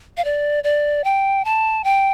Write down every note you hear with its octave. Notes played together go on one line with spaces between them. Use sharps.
F5
D5
D5
G5
A5
G5